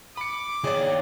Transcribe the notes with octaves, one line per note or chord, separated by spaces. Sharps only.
B5 D6 C#7
D#3 G#4 C#5 D5